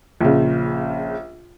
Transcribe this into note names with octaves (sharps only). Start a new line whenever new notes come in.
A#1 C#3